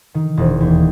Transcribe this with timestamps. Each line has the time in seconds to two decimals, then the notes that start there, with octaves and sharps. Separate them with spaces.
0.14 D#3
0.37 E1
0.60 D#2